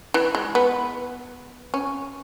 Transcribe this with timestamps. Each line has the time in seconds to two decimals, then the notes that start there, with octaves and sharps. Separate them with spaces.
0.14 E3
0.35 G#3
0.55 B3
1.74 C#4